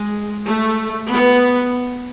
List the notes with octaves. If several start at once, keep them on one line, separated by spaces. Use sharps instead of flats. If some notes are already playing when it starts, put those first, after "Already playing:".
Already playing: G#3
A3
B3